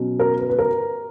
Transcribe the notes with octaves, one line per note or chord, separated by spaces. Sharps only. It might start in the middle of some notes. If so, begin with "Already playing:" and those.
Already playing: B2 F#3 C#4
A#4
B4
B4
A#4